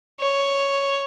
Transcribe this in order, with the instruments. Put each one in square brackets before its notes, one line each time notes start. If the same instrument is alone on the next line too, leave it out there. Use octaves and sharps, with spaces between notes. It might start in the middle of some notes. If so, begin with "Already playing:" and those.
[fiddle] C#5